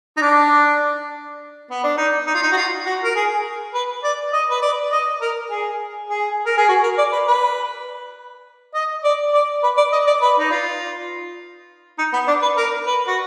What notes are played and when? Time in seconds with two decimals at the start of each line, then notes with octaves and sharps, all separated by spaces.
0.17 D#4
0.21 D4
1.71 B3
1.84 D4
1.98 D#4
2.27 D#4
2.35 F4
2.43 D#4
2.52 F#4
2.57 F4
2.86 F#4
3.03 A#4
3.16 G#4
3.74 B4
4.04 D5
4.33 D#5
4.51 B4
4.62 D5
4.92 D#5
5.22 A#4
5.51 G#4
6.10 G#4
6.46 A#4
6.58 G#4
6.69 F#4
6.84 A#4
6.98 D5
7.13 B4
7.28 B4
8.75 D#5
9.04 D5
9.34 D5
9.63 B4
9.78 D5
9.93 D#5
10.07 D5
10.22 B4
10.39 D#4
10.51 F4
11.98 D#4
12.13 B3
12.28 D4
12.42 B4
12.57 A#4
12.87 B4
13.07 F#4